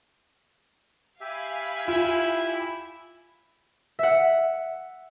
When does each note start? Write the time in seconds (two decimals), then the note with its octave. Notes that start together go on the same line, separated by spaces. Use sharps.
1.21 G4 E5 F5 G#5 B5
1.88 E4 F4
3.99 E5 F#5